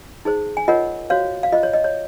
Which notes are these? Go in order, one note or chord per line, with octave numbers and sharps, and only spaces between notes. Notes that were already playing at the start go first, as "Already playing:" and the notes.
D#4 G#4 C5
G#5
F4 A#4 C#5 D#5 F#5
F#4 C5 C#5 F5
F5
F4 C5 D#5
C#5
D#5
C#5